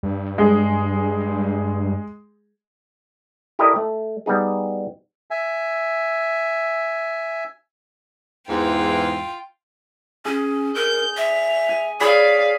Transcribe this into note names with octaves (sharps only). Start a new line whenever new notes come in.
G2
G#3 G#4
E4 G4 A4 A#4 D5 D#5
A3
G3 B3 D#4 G#4
E5 G#5
E2 G#2 E3 F4 G5
C#4 G#4
A#4 G6
E5 F7
G#5
G#4 C#5 D5 F5 G#5 B5